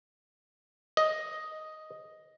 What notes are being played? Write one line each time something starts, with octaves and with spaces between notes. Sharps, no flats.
D#5